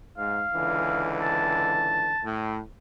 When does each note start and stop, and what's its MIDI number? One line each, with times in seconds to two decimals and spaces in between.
0.18 0.44 44
0.18 1.13 77
0.55 2.15 37
0.55 2.15 50
0.55 2.15 52
1.22 2.26 81
2.24 2.58 45